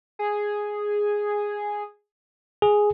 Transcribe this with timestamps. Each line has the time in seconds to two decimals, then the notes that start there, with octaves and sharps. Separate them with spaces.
0.19 G#4
2.62 G#4